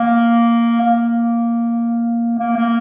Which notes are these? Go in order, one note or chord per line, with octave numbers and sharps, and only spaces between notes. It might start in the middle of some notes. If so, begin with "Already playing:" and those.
Already playing: A#3
A#3
A#3
A#3